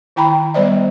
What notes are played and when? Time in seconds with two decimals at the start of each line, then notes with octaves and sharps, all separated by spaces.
0.16 D#3 E4 G5 A#5 B5
0.54 G3 B3 C5 D5 D#5